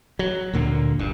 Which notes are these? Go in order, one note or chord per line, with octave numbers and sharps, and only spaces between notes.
F#3
D2 A#2 D3 A#3
G1 G2